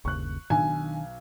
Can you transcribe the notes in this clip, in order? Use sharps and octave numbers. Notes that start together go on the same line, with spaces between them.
G1 D#2 C#3 C#6 F#6
B1 D#3 D4 G#5